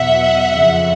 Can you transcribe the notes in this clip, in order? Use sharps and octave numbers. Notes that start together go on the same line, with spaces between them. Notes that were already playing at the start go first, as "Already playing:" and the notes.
Already playing: E2 B2 F#3 E5 F#5
F2 C#3 F3